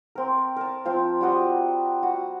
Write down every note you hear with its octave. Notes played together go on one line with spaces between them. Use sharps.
C4 A#4
A#4 A5
F3 C4 F4
G3 F4 F#4 D#5
F#4